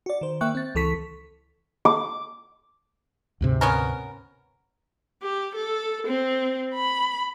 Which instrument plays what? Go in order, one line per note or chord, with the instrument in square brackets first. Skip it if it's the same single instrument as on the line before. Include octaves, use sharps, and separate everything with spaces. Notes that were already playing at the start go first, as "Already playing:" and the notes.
[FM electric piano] F#4 D5
D#3 C5
D#3 A#3 E5 G5 C#6 F#6
C4 A6
C#2 E3 A4 C#6 B6
[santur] D6
[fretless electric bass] D2 G#2 C3
[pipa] B3 C#4 A#4
[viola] G4
A4
C4
B5